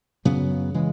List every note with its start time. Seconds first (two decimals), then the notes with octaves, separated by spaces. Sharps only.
0.25 F#2 C#3 F#3 B3
0.74 C#3 E3 G#3